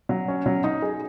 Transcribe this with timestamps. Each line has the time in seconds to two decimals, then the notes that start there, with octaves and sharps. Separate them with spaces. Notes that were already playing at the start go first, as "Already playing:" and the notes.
0.09 F#3
0.28 C#4
0.46 F#3
0.64 D#4
0.82 G#4